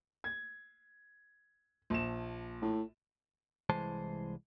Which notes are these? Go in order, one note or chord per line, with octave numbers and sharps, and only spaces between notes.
G#6
A#1 E7
A2
C2 E3 G#3 C5 A5